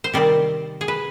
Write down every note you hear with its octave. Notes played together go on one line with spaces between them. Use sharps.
C5
C3 D#3 G3 C4 D5
G#4
B4